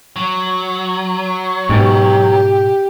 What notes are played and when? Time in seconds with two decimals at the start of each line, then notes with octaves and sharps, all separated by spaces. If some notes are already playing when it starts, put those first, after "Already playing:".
0.16 F#3
1.69 G#2 B2 G4